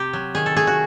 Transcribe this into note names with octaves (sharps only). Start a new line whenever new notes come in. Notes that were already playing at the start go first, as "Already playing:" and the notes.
Already playing: C3 G4
F#3
D#3 G#4
A4
A3 G#4
F#4